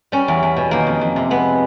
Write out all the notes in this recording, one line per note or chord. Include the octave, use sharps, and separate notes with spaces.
G3 C#4
E2
E2
B2
D#3 A#3
F2
F2
C3
G#3 B3